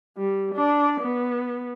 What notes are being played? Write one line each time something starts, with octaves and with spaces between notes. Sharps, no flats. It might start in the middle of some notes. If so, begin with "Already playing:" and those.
G3
D4 D5
B3